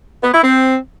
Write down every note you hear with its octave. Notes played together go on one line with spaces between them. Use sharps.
B3
E4
C4